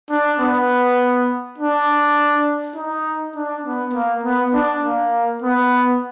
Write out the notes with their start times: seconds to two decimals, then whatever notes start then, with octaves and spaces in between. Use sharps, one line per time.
0.10 D4
0.40 B3
1.58 D4
2.75 D#4
3.35 D4
3.64 B3
3.93 A#3
4.24 B3
4.54 D4
4.83 A#3
5.42 B3